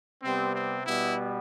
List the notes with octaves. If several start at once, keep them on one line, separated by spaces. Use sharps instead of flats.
C3 G3 B3 C4
C4
B2 G3 B3 E4